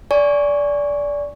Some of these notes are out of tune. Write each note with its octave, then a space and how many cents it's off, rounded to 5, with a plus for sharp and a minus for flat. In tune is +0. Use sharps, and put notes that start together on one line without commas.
D5 -20 G#5 +0 C#6 +0